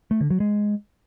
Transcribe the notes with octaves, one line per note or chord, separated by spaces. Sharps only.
A3
D3
F#3
G#3